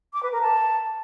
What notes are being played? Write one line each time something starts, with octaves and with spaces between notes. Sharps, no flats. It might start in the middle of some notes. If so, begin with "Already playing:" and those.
D6
B4
A#4
A5